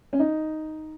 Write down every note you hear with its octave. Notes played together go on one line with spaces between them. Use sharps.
C#4
D#4